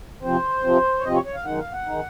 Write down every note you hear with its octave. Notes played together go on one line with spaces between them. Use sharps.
C3 F3 C4 C5
C3 F3 C4
C#5
C3 F3 C4 D#5
C#5
C#5
F5
F#2 D#3 G#3 D#4 F#5
F5
F#5
D#3 G#3 D#4